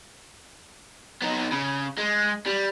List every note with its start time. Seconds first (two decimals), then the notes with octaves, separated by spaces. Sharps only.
1.22 B3 D#4
1.52 C#3
1.98 G#3
2.46 G3